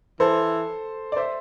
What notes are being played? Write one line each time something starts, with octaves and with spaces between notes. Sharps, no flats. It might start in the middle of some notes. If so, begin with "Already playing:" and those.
E3 A4 C5
D5
C5 E5